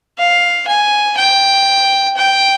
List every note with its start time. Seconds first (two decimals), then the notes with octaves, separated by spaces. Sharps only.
0.18 F5
0.68 G#5
1.17 G5
2.17 G5